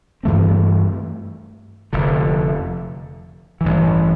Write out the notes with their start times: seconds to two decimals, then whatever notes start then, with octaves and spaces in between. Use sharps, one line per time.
0.23 G2 E3 A3 C4
1.93 F1 F2 D3
3.61 A1 G2 E3